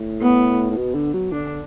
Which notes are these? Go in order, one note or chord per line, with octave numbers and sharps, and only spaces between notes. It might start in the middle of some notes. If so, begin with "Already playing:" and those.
Already playing: A2
B3
A2
B2
D3
F#3
D3 D4